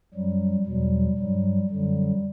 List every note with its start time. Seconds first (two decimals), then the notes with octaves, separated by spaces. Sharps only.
0.14 F#2 F#3 G3
0.66 E2 B2 F#3 G3
1.17 G2 F#3 G3
1.70 F#2 D3 F#3 G3